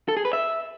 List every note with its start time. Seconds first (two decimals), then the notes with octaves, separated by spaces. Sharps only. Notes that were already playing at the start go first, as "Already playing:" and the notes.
0.08 A4
0.17 G#4
0.25 B4
0.33 E5